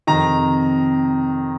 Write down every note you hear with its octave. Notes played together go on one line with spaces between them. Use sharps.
F2 C3 D#3 A#5